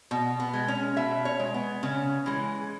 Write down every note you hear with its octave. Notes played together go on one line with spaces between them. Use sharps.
B2
B3
G#3
C#4
B2 E5
C#5
G#3
B3
C#3 C#4
E3 G#3